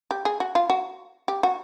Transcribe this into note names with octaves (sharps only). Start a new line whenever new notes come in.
G4
G#4
F#4
F4
F#4
G4
F#4